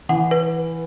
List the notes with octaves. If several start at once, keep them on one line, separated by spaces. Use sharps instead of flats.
E3 F#5
B4